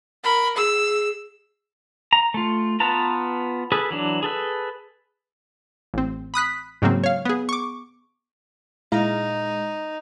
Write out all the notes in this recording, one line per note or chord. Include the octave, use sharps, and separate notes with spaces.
A#4 B5
G#4 E6
A#5
A3 F4
B3 F4 B4 A5 A#5
G#4 A4 B4
E3 F#3 D4
G#4 A4 B4
A1 C4
B5 D#6 F#6 B6
G#2 C#3 F#3 A#3 C4
C#5 F5
B3 G#4
C#6 D6
A#2 G#3 D#4 E4 F5 A#5